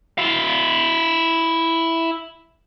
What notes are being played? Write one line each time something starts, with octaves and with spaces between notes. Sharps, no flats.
E4 F5